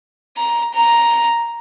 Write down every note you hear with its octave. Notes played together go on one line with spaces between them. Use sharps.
A#5
A#5